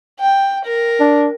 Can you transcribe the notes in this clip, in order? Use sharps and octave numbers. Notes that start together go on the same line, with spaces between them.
G5
A#4
D4